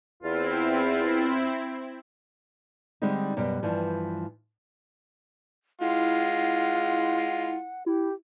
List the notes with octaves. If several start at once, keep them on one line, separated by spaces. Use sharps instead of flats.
E2 C4 E4 F4
D3 G3 G#3 C4 D#4
F#2 B2 G3
G2 E3 F3
G#3 E4 F4 F#5
E4 G4